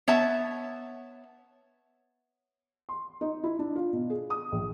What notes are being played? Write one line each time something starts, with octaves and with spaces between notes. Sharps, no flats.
B3 C#5 E5 A5
C6
D#4
E4
D4
F4
B2
G#4
D#6
A#1